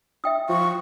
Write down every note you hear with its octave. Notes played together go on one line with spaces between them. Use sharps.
E5 G5 D#6
F3 C#6